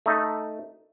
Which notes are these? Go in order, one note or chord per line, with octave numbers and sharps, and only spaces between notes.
A3 D#4